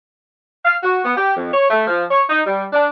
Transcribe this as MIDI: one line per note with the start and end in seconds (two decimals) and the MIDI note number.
0.65 0.76 77
0.83 1.00 66
1.05 1.16 59
1.17 1.35 67
1.37 1.50 41
1.54 1.67 73
1.71 1.84 57
1.87 2.04 53
2.11 2.23 73
2.30 2.41 63
2.46 2.65 55
2.73 2.88 62